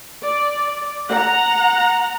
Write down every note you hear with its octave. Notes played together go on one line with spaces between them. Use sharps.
D5
F#5 A#5